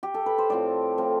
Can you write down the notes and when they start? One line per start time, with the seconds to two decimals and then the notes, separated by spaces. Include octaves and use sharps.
0.03 G4
0.14 A4
0.26 B4
0.38 C5
0.50 A2 F3 C4 D5
0.98 A2 F3 C4 C5